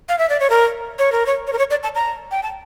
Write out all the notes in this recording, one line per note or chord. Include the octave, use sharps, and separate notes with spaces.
F5
E5
D5
C#5
A#4
C#5
A#4
C#5
C#5
A#4
C#5
D5
A5
A#5
G5
A5